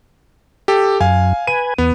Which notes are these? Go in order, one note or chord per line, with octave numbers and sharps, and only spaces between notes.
G4 A4
F#2 F5 G#5
B4 G#5 D#7
E2 B3